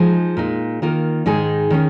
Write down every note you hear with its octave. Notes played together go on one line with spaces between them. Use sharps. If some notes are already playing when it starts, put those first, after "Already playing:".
Already playing: F3 G#3 D#4 G#4
A#2 G#3 D#4
D#3 A#3 F4 A#4
G#2 D#3 G#3 D#4 G#4
D#3 C#4 G#4